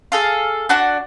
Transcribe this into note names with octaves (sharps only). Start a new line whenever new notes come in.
G#4 A4 F5
D4 F#4 F#5